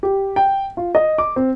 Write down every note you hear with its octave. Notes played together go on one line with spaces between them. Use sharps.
G4
G5
F4
D#5
D6
C4